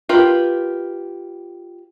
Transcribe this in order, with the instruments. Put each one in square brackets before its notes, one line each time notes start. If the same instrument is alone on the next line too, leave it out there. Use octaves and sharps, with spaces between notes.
[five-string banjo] F4 G4 A#4 B4